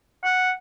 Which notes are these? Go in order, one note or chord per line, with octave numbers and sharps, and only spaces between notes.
F#5